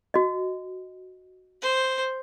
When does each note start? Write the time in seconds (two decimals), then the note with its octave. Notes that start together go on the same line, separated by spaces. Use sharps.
0.14 F#4 D#5
1.62 C5